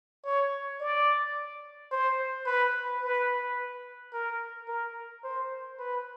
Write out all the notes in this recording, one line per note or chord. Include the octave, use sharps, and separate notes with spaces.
C#5
D5
C5
B4
B4
A#4
A#4
C5
B4